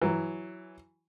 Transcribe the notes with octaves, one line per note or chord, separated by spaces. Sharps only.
E3 F#3